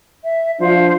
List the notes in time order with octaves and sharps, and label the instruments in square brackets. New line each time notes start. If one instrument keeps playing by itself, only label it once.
[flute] E5
[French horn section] F3 D4 F4 [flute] C5